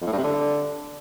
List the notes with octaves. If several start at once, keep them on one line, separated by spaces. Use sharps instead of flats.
F2
A2
G2
C3
D3